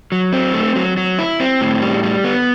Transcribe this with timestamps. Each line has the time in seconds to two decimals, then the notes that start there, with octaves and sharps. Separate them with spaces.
0.12 F#3
0.33 C4
0.54 A3
0.76 F#3
0.97 F#3
1.19 E4
1.40 C4
1.61 A2
1.82 G3
2.03 G3
2.24 B3